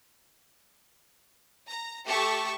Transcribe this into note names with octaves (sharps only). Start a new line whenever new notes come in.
A#5
A3 G4 A4 A5 C#6